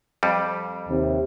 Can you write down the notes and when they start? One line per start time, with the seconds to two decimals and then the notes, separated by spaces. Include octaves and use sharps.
0.23 F2 G3
0.89 D#2 C3